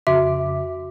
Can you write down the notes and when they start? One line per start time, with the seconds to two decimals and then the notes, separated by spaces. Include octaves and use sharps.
0.07 F2 C#3 F#4 E5 D6